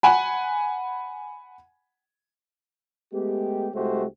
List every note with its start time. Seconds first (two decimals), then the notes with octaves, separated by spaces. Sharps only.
0.03 F#5 G#5 B5
3.13 G#3 A3 B3 G4
3.75 C2 G#3 A3 F#4 G4 C5